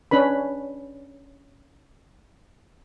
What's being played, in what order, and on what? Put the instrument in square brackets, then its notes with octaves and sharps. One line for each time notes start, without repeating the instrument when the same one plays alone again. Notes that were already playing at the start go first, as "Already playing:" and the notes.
[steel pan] C#4 D4 B4 B5